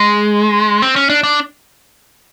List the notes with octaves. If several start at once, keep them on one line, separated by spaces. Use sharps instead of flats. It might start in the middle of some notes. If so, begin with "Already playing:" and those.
Already playing: G#3
C4
C#4
D4
D4